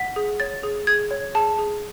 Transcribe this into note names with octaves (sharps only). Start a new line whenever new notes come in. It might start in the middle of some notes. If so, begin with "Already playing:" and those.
Already playing: F#5 B6
G#4
C#5 A6
G#4
G#4 G#6
C#5
G#4 A5
G#4